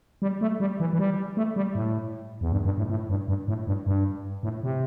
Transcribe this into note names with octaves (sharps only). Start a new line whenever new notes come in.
G3
A3
G3
E3
E3
G3
A3
G3
A2
E2
G2
G2
A2
A2
G2
G2
A2
G2
G2
A2
C3